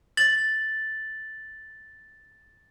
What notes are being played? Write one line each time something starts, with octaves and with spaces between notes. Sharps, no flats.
A6 F#7